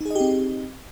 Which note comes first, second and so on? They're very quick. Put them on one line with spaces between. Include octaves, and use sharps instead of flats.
D#4 G#4 D#5 G4 C4